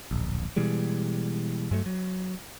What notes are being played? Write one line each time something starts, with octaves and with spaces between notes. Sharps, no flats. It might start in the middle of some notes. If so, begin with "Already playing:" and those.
D1 A#1
B2 E3 G3 G#3
G2 F#3 G#3 A3
F#3